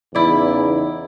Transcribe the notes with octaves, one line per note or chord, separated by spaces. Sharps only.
E2 C#3 D#4 E4 D5